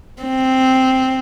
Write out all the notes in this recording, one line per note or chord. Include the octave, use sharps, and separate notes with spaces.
C4